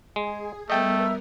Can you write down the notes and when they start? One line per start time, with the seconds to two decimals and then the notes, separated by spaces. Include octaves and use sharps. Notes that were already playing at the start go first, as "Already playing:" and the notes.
0.16 G#3 G#4
0.70 G3 A3 B3 A#4 D#5 E5 G5 A5